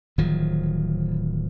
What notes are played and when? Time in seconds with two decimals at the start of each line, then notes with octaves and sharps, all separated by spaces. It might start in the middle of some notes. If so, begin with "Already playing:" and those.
0.18 D1 D#3 F3 F#3